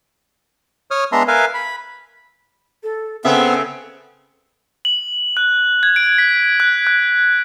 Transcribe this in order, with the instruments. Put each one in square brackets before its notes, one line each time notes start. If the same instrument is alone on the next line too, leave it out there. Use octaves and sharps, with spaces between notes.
[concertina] C#5 D#6 F6
G#3 B3 D4 E5 A#5 C6
A#4 B4 E5 F5 G#5
B5
[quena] A4
[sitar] C#3 G#4 E5 [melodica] B3 C4 [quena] A4
[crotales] F#7
F#6
G#6
D7
B6
F#6
F#6